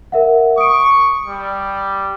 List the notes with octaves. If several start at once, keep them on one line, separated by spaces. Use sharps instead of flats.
A#4 E5 F#5
C#6 D#6 D7
G3